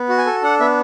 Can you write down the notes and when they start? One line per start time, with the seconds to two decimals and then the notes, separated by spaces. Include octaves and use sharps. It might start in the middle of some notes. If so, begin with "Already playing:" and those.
Already playing: B3
0.09 F#4
0.18 G#5
0.26 A4
0.42 D4 F#5
0.60 B3 E5